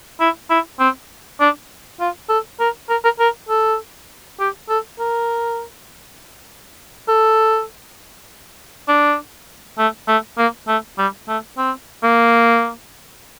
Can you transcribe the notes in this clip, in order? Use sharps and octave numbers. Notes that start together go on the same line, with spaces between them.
E4
E4
C4
D4
F4
A4
A#4
A#4
A#4
A#4
A4
G4
A4
A#4
A4
D4
A3
A3
A#3
A3
G3
A3
C4
A#3